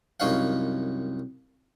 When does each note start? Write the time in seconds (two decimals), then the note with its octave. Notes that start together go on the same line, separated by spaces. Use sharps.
0.20 C2 F#2 D#4 C#5 F5 F#5